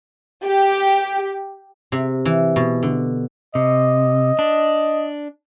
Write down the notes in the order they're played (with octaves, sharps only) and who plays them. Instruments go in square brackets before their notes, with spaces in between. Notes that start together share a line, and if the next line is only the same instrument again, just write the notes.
[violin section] G4
[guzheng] C3
E3
B2
D3
[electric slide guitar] C3 [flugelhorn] D#5
[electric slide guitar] D4